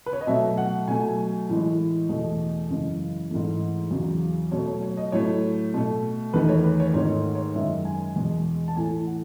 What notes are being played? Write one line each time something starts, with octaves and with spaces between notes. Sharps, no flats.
B4
C#5
D#5
B2 F#3 A3 E5
F#5
B2 F#3 A3 G#5
A2 E3 G#3
E2 B2 A3 D#5
F#2 C#3 E3 G#3
G#2 E3 A3
E2 C#3 F#3
B2 F#3 A3 C#5
C#5
C#5
D#5
A2 F#3 A3 C#5
B2 A3
E2 D#3 A3 B4
C#5
B4
C#5
G#2 D#3 A3 C#5
C#5
F#2 D#3 G#3 E5
G#5
E2 B2 G#3
A5
A2 E3 A3 G#5
F#5